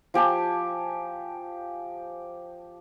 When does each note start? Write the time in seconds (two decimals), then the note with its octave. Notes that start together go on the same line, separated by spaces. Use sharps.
0.14 F3 G4 G#5 A5